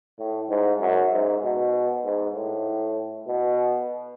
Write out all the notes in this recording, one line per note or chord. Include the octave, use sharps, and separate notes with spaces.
A2
G#2
F#2
G#2
B2
G#2
A2
B2